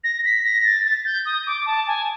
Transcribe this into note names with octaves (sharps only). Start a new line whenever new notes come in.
A#6
B6
A#6
A6
A6
G6
D#6
D6
A5
G#5